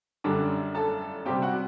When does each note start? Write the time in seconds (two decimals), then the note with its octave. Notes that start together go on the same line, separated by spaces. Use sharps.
0.24 F#2 D3 G3 D4
0.75 A4 A5
1.26 C3 G3 C4 G4 G5
1.42 F#4 F#5